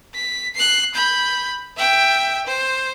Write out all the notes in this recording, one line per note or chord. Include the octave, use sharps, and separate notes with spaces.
B6
F#6 C7
B5 G6
E5 G5
C5